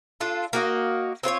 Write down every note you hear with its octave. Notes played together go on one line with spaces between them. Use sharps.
D4 F4 A4
A#3 F#4 D#5
C4 F4 C5 C#5